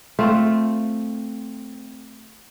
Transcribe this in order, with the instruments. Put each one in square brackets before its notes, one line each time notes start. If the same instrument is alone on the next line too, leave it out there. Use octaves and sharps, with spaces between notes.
[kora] A3 C4 F4